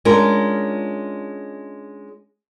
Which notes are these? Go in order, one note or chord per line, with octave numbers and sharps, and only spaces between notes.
G#3 C#4 D4 F4 A#4